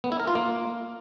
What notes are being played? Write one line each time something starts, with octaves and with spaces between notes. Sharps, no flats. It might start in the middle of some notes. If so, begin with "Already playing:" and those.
B3
E4
A#4
F4
A#3